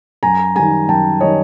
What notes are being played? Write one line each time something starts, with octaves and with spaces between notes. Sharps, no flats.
F#2 G#5 A#5
D#3 G3 G#5 A#5
F#2 G5 A5
D#3 G3 C#5 D#5